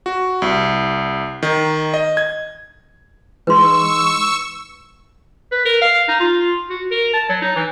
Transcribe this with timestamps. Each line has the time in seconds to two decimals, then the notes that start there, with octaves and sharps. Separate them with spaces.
0.06 F#4
0.42 C2
1.43 D#3
1.94 D#5
2.17 G#6
3.47 E3 G#3 D#4 B4 C6 C#6 E6
5.52 B4
5.65 A#4
5.82 F5
6.09 D#4
6.20 F4
6.70 F#4
6.91 A#4
7.13 A5
7.29 F#3
7.42 D#4
7.56 E3